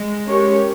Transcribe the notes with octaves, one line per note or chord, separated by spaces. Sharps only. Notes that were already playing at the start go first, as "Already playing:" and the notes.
Already playing: G#3
C#4 G4 A#4 C#5